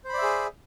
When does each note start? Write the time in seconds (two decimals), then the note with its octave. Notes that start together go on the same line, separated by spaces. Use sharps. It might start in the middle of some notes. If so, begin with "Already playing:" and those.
0.05 C5
0.09 B5
0.14 D5
0.18 E5
0.23 G#4